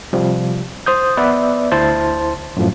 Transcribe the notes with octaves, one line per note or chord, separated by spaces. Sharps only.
C3 F3 G3
C5 D#6 G6
B3 B4 D5 E5
D2 E4 C5 A5 C6 A6
F#2 A2 F3